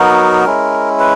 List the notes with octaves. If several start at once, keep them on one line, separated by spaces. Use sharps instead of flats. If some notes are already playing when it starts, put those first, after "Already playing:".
Already playing: F#3 B3 D#4 F#4 A#4
G#3 C#4 E4
B4